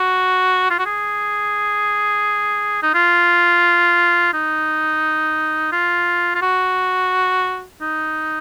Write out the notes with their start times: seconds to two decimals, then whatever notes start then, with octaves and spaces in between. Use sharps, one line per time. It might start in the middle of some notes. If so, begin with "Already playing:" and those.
Already playing: F#4
0.70 F4
0.79 F#4
0.86 G#4
2.83 D#4
2.94 F4
4.34 D#4
5.72 F4
6.35 F4
6.42 F#4
7.81 D#4